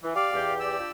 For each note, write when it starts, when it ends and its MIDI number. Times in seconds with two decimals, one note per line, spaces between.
0.03 0.14 52
0.15 0.31 67
0.15 0.54 74
0.15 0.54 77
0.15 0.31 86
0.33 0.77 40
0.33 0.77 67
0.60 0.91 74
0.60 0.91 88
0.79 0.91 62
0.79 0.91 65
0.79 0.91 67